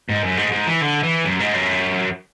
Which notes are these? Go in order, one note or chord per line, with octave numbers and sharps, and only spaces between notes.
G#2
F#2
G#2
G#2
E3
D3
E3
F#2
G#2
F#2